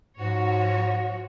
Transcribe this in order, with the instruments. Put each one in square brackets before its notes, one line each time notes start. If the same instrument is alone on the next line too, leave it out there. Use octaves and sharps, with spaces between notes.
[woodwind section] G#2 [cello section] F3 F#4 C#5